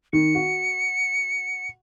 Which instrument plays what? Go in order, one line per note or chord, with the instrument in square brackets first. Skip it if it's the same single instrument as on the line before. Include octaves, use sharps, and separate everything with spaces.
[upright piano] D#3 [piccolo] C#7
[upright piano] F#4